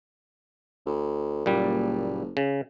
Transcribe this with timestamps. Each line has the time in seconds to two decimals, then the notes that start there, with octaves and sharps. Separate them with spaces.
0.86 D2
1.46 F#1 A#2 G3
2.37 C#3